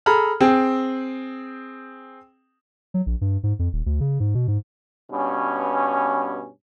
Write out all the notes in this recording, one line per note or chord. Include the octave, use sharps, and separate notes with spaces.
G#4 A4 A#5 B5 F6
C4 G#4 G5
F#3
A#1
G2
G#2
F2
D#1
D2
C#3
G#2
B2
G#2
G2 B2 C#4